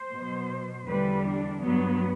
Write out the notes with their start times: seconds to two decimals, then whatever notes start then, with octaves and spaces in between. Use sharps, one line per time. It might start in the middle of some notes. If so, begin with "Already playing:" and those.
Already playing: C5
0.13 B2 F#3
0.87 E2 D3 G3 B4
1.25 D4
1.62 G2 F#3 B3